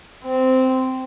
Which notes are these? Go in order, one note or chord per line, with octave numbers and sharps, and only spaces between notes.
C4